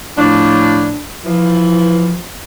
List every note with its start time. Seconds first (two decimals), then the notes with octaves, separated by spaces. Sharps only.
0.17 A2 F3 D4
1.25 E3 F3